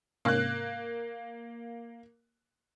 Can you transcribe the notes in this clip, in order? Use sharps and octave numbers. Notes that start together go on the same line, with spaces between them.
G#2 C3 A#3 C#4 F#6